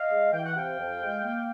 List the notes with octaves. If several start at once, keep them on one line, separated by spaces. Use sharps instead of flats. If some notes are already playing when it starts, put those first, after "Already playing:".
Already playing: D#5 F5
G#3
E3 G5
F#5
C3 F5 G5
F2
G#3
A#3